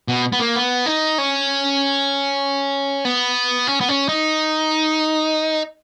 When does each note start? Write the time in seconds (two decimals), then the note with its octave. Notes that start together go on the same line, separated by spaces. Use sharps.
0.08 B2
0.33 B3
0.40 A#3
0.56 B3
0.86 D#4
1.18 C#4
3.05 B3
3.67 C#4
3.81 B3
3.89 C#4
4.09 D#4